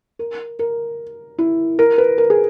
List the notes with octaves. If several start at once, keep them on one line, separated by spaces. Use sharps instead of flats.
A#4
A#4
E4
A#4
B4
A#4
G#4